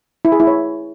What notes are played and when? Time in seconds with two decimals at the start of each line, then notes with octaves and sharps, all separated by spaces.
0.25 E4
0.32 G#4
0.40 E4
0.47 C#5